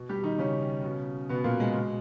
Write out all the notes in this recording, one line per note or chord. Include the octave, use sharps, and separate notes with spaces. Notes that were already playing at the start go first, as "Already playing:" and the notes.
Already playing: B2
G3 G4
D#3 D#4
C#3 C#4
B2
B2 B3
A#2 A#3
G#3
B2